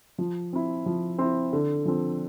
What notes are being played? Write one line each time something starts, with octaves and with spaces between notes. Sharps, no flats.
F3
C4 E4
F3
C4 E4
D3
F3 C4